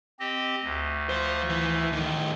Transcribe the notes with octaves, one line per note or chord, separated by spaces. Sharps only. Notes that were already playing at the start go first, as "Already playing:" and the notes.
C4 G4 D#5
D2
F3 C5
E3
A2 D#3